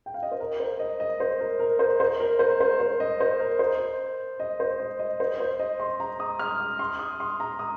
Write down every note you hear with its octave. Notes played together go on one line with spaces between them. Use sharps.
G5
F5
D#5
C5
A#4
C5
D#5
D#5
C5
A#4
A#4
C5
C5
A#4
C5
C5
C5
D#5
C5
A#4
C5
D#5
C5
D#5
D#5
C5
C5
D#5
C6
A#5
D#6
F6
D#6
C6
D#6
C6
A#5
D#6